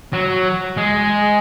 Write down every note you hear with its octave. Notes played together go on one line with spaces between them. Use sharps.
F#3
G#3